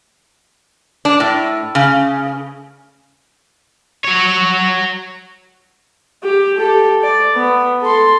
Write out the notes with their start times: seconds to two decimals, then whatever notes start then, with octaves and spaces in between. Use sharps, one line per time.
1.05 D4
1.20 A2
1.75 C#3
4.05 F#4 C#5
6.24 G4
6.58 G4 A4
7.03 D5
7.35 B3
7.82 A4 C6